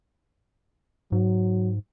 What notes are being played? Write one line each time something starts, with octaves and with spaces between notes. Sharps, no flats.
G#2 F#3